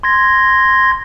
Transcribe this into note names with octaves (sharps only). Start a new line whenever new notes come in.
C6 G#6 A#6